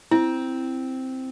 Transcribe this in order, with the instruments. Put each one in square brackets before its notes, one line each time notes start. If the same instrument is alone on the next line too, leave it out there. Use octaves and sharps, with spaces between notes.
[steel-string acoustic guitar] C4 [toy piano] E4